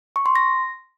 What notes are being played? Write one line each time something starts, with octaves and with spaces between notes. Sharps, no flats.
C#6
C6
A#6